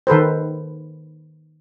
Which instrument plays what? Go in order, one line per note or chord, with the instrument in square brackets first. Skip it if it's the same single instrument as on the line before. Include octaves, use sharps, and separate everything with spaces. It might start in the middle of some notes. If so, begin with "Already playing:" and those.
[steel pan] D#3 A4 B4 C5